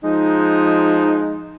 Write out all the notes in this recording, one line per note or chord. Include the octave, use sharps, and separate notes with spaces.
F3 G#3 D#4